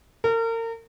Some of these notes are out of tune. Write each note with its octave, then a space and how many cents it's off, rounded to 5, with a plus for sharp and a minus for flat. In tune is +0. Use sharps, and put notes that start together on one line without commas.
A#4 -35